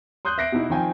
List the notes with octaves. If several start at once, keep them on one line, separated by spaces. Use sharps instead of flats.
C6 D#6 F#6 G6
E5 F#6 A#6 C7 D7
B2 D#4 E4
D#3 F3 C4 G5 G#5